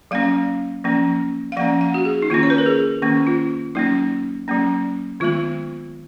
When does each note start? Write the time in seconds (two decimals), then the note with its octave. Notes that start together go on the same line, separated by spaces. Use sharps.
0.11 F#3 A#3 C#4 F5
0.84 F3 A#3 C#4
1.52 F5
1.57 F3 A#3 C#4 F#5
1.81 F#5
1.94 F#4
2.05 G#4
2.22 D#4
2.30 D#3 A#3 C#4 F4
2.43 C#5
2.50 B4
2.58 A#4
2.66 G#4
3.02 D#3 A#3 C#4
3.27 F4
3.75 F#3 A#3 C#4 D#4
4.48 F#3 A#3 C#4
5.20 D#3 G#3 B3 F4